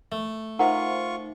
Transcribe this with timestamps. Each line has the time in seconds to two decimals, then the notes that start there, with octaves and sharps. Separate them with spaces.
0.12 A3
0.59 D#4 F4 A#4 C5 E5 F#5 A#5 C#6